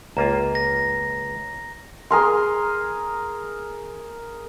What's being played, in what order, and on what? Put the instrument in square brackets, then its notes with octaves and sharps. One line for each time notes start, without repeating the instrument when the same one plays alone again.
[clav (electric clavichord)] C#2 A#3 F4 [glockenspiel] A#5
[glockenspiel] A#6
[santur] G#4 A#4 C6